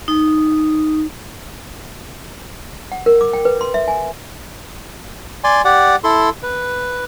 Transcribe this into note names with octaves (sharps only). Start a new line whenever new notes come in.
D#4
F#5
A#4
D6
G5
B4
C6
E5
G#5
D5 G#5 C6
G4 D5 F#5
E4 A4 C6
B4